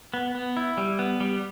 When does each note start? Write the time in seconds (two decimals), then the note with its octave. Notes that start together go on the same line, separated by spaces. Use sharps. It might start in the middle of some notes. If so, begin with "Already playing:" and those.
0.14 B3
0.35 B3
0.57 E4
0.77 G3
0.99 B3
1.20 G3